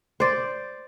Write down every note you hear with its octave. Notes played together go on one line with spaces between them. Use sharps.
C5 D5